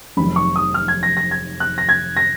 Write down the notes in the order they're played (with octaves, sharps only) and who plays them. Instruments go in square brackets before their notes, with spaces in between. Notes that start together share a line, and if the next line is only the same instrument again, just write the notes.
[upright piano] F1 F2 D#3 F#3 [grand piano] B5
[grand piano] C#6
D#6
F6
G#6
A#6
A#6
G#6
F#6
A#6
G#6
A#6